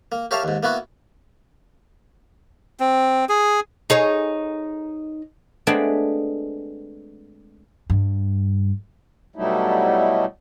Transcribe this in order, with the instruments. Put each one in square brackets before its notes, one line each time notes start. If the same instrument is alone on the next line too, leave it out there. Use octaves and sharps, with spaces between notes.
[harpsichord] A#3
G4 A#4 C#5 E5 F5 A5
D#2 G#2
A#3 B3 E4 F#4
[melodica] C4
G#4
[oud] D#4 G#4 C#5
[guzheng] G#3 A3 B3 C4 D4 G#4
[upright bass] G2
[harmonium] B2 F#3 G3 A3 D#4 E4